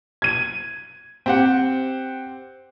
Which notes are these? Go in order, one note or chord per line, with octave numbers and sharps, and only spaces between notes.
G#6 D#7
C4 G4 F#5